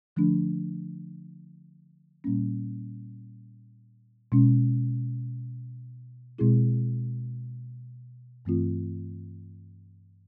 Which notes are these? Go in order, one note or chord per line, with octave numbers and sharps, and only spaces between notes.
D3 F3 A3 D4
A#2 G3 A#3 C#4
B2 G#3 C#4
B2 G#3 C4 E4 G#4
G2 E3 A3 C4 F4